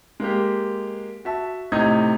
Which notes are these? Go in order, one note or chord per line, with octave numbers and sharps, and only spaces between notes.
G#3 A#3 G4
F#4 E5 A5
A2 C3 D#4 D#5 D#6 G#6